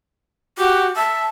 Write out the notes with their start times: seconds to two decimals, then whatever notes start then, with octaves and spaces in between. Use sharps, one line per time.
0.58 F#4 G4
0.96 E5 A5